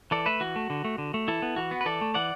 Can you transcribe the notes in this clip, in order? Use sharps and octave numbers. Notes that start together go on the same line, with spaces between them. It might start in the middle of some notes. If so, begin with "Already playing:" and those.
E3 A4 D5
A3 B4 E5
E3 F#4
A3
D3
A3
D3
A3
E3 E4 A4
B3
E3 F#4
B3
B4
E3 A4 D5
A3
E3 D5 F#5